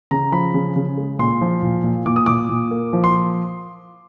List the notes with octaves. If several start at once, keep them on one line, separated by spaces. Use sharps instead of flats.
C#3 A#5
F3 B5
C#3
C#3
G#3
A#2 C6
F3
A#2
A#2
A#2 D6
D#6
A#2 D6
A#2
A#3
F3
C6